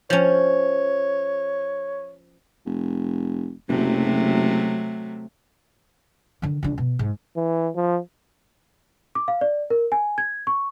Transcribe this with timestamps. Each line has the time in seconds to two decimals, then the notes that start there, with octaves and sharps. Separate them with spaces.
0.10 F3 C#4 C#5
2.66 F1
3.69 F#1 C3 F#3 A3
6.42 D3 D#3
6.63 C#2 D3
6.78 B2
6.99 G#2
7.37 E3
7.76 F3
9.15 D6
9.28 F5
9.41 D5
9.70 A#4
9.92 G#5
10.18 G#6
10.47 C#6